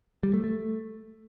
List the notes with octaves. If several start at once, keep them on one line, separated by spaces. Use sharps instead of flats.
G3
A3
A3